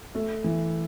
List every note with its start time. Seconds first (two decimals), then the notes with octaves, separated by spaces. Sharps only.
0.15 A3
0.44 E3